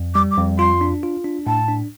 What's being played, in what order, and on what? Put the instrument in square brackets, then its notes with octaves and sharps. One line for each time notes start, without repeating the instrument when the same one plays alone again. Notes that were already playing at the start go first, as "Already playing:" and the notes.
Already playing: [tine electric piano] F2
[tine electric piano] G3 [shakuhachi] D6
[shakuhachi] D6
[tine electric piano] F2
[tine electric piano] F4 [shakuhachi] C6
[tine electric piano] D4
F4
D4
[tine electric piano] A2 [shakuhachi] A5
[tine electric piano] D4